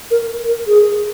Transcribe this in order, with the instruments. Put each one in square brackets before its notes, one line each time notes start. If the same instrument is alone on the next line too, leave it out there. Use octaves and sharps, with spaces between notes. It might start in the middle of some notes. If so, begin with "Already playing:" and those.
[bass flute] A#4
A#4
G#4